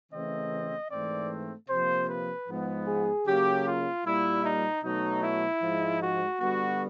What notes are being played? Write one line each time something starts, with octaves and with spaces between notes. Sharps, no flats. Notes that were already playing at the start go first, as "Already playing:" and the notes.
C#3 E3 A3 C4 D#5
G#2 E3 A3 C4 D5
C3 F3 A#3 C5
B4
G#2 F3 G#3 B3
G#4
C#3 F#3 A#3 G4
F4
A#2 G3 A#3 E4
D#4
B2 F#3 A3 D#4
E4
G#2 F3 G#3
F#4
D3 G3 B3 F#4